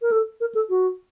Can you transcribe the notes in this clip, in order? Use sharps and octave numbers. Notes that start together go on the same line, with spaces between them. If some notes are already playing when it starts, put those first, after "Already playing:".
A#4
A4
A#4
A4
F#4